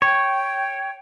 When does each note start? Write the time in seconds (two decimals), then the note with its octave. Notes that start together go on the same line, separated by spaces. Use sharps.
0.02 C#5 G5